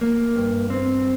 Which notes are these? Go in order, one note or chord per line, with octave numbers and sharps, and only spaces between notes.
A#3
G2
C4